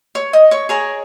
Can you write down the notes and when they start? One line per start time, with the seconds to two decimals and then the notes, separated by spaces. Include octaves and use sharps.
0.15 C#5 C#6
0.33 D#5 D#6
0.51 C#5 C#6
0.69 G#4 A#4 C#5 A#5